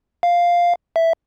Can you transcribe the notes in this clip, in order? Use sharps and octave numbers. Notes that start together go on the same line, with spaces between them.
F5
E5